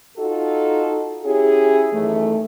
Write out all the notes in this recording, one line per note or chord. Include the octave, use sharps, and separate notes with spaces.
D#4 F4 F#4 A4
C#4 E4 G4 G#4
F#2 D#3 E3 A3